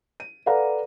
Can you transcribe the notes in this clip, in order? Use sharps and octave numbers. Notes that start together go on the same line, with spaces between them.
D#7
A4 B4 D5 F5 F#5 A#5